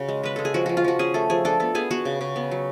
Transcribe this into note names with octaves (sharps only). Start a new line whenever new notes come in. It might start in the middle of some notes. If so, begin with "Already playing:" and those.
Already playing: C#3 F#4
G#3
G#3 B4
G#3 A4
G#4
F3 F#4
F3 F#4
F4
F3 F#4
C#4 G#4
A3 A4
F3 G#4
D4 A4
B3 A4
B3 G#4
B3 F#4
C#3
C#3
B3
F#3